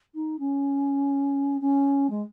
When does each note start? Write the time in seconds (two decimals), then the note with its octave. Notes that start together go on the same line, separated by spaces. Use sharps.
0.15 D#4
0.39 C#4
1.61 C#4
2.10 G#3